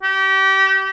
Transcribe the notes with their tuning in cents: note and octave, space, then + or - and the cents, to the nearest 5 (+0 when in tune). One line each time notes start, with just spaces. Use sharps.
G4 -30